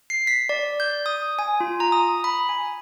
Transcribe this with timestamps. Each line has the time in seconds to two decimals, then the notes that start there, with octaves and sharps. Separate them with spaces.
0.10 C7
0.27 B6
0.49 D5
0.80 G6
1.06 D#6
1.39 G#5
1.60 F4
1.80 A#5
1.92 D#6
2.24 B5
2.49 G#5